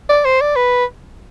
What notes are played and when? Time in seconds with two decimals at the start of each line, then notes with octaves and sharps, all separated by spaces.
0.09 D5
0.25 C5
0.41 D5
0.56 B4